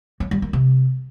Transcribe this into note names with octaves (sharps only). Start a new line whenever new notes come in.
F#3
G3
A#3
C3